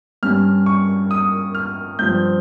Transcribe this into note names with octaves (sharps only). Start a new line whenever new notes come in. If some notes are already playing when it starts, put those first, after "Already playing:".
G2 G3 C#4 F6
C#6
D#6
F6
G2 F3 C4 G6